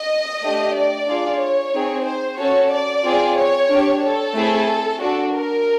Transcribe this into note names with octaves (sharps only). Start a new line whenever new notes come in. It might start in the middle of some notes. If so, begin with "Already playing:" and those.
Already playing: D#5
A3 D4 G4
D5
D4 F4 G#4
C#5
C4 D#4 G#4
C5
C#4 F#4 A4 C#5
D5
C4 F4 G#4
C#5
D4 G4
A4
A3 C4 E4 G#4
D4 F#4 A4
A#4